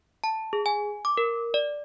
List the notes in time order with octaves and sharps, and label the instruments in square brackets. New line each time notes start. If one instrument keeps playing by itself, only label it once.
[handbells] A5
G#4
G#5
D6
A#4
D5